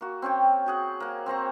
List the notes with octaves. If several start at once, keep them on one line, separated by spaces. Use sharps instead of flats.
A#3 F#4
C4 C#4 C#5 G5
F#4 G#4 F#5
A#3 F#5
C4 C5 A#5 C#6